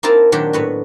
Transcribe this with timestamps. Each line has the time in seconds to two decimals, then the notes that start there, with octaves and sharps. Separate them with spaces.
0.03 A#3 C4 D#4 E4 A#4 A5
0.32 A#2 D#3 F#3 D4 G4
0.53 A2 B3 F#4